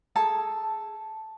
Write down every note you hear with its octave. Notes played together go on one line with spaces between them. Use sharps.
G#4 A4 A5